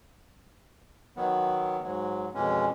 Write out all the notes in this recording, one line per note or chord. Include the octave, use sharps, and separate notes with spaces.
D#3 F#3 B3
G#2 F#3
F2 B2 E3 G#3 C#4